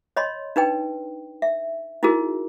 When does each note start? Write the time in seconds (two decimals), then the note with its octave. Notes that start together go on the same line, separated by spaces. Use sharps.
0.16 C#5 D#5 B5 C6
0.56 D4 D#4 B4 G5
1.42 E5
2.03 D#4 E4 F#4 G#4 A#4